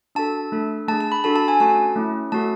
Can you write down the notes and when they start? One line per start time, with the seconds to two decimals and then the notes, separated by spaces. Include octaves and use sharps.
0.15 D4 F#4 A4 A5
0.52 A3 D4 A4
0.88 A3 D4 G#4 A5
1.01 A5
1.12 B5
1.24 D4 F#4 A4 A5
1.36 A5
1.48 G#5
1.60 A3 C#4 F#4 A4 A5
1.96 A3 C#4 E4
2.32 A3 C#4 F#4 A4 A5